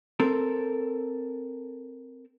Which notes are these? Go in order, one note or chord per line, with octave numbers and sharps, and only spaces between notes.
C4 A4 A#4